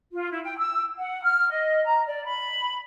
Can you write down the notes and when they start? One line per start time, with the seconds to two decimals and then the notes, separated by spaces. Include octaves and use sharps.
0.12 F4
0.30 E4
0.44 G5
0.57 E6
0.97 F#5
1.22 F6
1.49 D#5
1.84 A#5
2.06 D5
2.24 B5